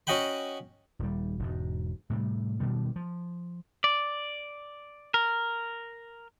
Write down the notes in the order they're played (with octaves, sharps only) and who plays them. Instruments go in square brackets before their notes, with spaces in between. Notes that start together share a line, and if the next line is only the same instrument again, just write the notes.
[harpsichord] C#4 F#4 D#5 F#5 G5 B5
[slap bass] D#1 G3
E1 G#2
A2 C3 G3
B2 D#3 G3
F3
[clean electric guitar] D5
A#4